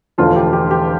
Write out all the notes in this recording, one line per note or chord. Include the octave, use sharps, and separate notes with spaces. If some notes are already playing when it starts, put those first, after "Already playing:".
E1 E2 D3 F3 A3 F4
G4
G4
G4